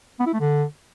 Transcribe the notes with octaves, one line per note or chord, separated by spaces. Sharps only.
B3
E4
A3
D3